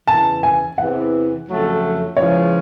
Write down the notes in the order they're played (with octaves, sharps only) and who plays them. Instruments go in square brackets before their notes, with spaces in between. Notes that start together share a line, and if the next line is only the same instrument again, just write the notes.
[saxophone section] E2 C#3 E3 [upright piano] A5
[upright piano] G#5
[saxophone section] E2 C3 E3 [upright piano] F#5
[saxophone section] F2 C#3 F#3 A3
[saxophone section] E2 C#3 F3 G#3 [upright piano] C#5